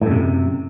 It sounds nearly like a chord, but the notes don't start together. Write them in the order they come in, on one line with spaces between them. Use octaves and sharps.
A2 F#2 C3